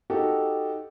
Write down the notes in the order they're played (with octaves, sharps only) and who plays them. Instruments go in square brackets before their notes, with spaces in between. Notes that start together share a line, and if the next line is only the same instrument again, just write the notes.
[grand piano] D#4 F#4 G4 A4